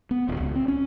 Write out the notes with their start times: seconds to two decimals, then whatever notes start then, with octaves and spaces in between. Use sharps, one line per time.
0.11 B3
0.29 D1
0.40 C#2
0.56 C4
0.68 C#4